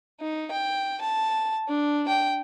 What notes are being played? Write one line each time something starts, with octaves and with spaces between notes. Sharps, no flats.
D#4
G5
A5
D4
G5